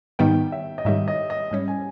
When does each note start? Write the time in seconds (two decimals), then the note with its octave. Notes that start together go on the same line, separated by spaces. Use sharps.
0.19 G#2 D#3 G3 B3 D#4 G5
0.52 E5
0.78 D#5
0.85 G#2 D#3 G3 E5
1.08 D#5
1.30 D#5
1.51 G#2 G3 C#4
1.68 G#5